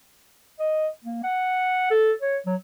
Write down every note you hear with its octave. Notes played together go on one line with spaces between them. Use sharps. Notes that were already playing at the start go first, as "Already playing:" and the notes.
D#5
A#3
F#5
A4
C#5
F#3